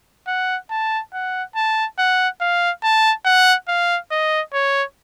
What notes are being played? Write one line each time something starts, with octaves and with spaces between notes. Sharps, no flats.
F#5
A5
F#5
A5
F#5
F5
A5
F#5
F5
D#5
C#5